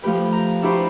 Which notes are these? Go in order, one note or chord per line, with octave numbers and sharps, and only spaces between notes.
F3 A3 G4 B4 G5
A#5
D4 E4 F#4 G4 B4 C5